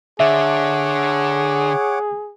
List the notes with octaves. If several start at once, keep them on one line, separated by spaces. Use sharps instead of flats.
D3 G#4 C#5 E5 F#5 D6